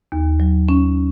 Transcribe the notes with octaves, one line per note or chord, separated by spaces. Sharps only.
D#2
F#3
C#4